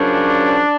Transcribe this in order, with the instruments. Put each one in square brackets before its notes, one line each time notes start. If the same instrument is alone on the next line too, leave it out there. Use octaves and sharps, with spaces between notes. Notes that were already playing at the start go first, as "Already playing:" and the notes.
Already playing: [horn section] F#2 C#3 F3 D4